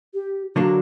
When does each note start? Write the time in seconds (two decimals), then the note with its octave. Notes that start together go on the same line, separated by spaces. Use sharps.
0.14 G4
0.55 D3 F#3 A#3 D4 F#4